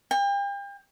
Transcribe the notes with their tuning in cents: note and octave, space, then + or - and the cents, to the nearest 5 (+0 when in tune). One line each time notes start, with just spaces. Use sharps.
G5 +35